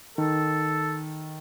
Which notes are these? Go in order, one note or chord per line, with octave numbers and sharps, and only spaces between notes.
D#3 A4